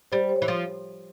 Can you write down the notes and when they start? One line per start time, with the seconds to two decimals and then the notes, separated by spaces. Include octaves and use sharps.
0.12 G3 C5
0.29 C5
0.36 C#5
0.42 E3
0.48 F3